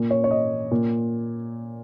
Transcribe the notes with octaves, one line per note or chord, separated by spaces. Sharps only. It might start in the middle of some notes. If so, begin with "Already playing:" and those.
Already playing: A#2
C#5
C#5
D#5
A#2